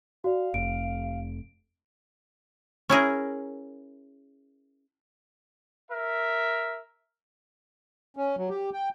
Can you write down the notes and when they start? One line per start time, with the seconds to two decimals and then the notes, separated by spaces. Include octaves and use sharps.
0.24 F#4 D5 F5
0.54 F1 D7
2.90 C#4 E4 G#4 A#4
5.90 A#4 E5
8.17 C#4
8.37 F#3
8.49 G4
8.73 G5